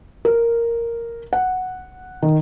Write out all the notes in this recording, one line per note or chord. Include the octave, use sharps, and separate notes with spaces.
A#4
F#5
D#3